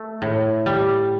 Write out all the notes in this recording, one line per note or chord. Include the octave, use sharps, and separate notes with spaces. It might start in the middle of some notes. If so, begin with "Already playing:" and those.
Already playing: A3
A2
G3